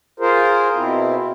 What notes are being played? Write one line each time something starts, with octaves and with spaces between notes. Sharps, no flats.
F4 G#4 A#4 C5
B2 C4 E4